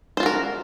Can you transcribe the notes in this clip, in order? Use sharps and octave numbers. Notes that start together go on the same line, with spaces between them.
F4 F#4 A#4 C5